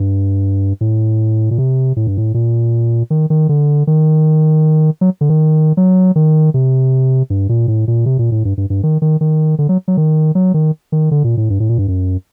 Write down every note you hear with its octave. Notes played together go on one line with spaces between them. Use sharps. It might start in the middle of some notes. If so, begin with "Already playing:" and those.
Already playing: G2
A2
A#2
C3
A2
G2
A2
A#2
D#3
D#3
D3
D#3
F#3
D3
D#3
F#3
D#3
C3
G2
A#2
A2
A#2
C3
A#2
A2
G2
G2
G2
D#3
D#3
D#3
D3
F#3
F#3
D#3
F#3
D#3
D#3
D3
A#2
A2
G2
A2
A#2
G2
F#2